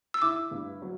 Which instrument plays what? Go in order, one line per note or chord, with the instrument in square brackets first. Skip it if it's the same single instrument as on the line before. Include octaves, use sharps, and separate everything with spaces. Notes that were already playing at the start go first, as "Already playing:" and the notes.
[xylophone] E6
[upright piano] E4 [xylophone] D6
[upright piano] G2
F#3